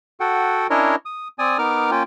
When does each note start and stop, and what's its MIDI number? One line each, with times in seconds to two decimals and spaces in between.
0.20 0.67 66
0.20 0.67 69
0.20 0.67 78
0.20 0.67 79
0.70 0.96 61
0.70 0.96 62
0.70 0.96 64
0.70 0.96 70
0.70 0.96 73
0.70 0.96 75
1.05 1.28 87
1.39 1.58 60
1.39 1.58 74
1.39 1.58 80
1.39 1.58 87
1.58 1.91 59
1.58 1.91 63
1.58 1.91 70
1.58 1.91 86
1.58 1.91 89
1.91 2.03 58
1.91 2.03 61
1.91 2.03 65
1.91 2.03 79